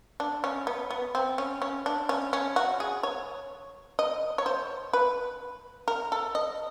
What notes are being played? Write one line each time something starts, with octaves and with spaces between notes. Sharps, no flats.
D4
C#4
B3
B3
C4
C#4
C#4
D4
C#4
C#4
F#4
G#4
C#5
D#5
C#5
C5
B4
A#4
A4
D#5